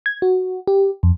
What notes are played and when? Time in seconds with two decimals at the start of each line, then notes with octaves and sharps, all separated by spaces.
0.06 G#6
0.22 F#4
0.67 G4
1.03 F2